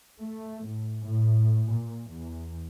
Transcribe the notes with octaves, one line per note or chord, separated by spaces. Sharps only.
A3
A2
A2
A#2
E2